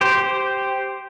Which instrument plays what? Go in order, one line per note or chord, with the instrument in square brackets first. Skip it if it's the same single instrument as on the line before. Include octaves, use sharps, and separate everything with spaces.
[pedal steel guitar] G4 C5